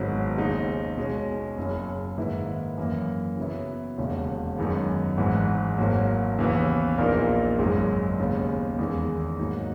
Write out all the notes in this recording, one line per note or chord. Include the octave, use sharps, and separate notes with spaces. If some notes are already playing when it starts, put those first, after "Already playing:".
Already playing: G#1 G#2 D#3 F#3 B3
D#2 C#3 G#3 D#4
B2 G#3 C#4
F#1 F#2 C#3
G#2 D#3 A#3 E4 B4
F#2 E3 A#3
C#3 F#3 B3 E4
E1 D#2 C#3
F#2 D#3 G#3 B3
G#1 G#2 E3
G#1 G#2 F#3 A#3
D#2 C#3 E3 B3
A#1 A#2 A#3 D#4 A#4
G#1 F#2 C#3 G#3
D#2 C#3 G#3 B3
E2 D#3 G#3
G#2 F#3 A#3 D#4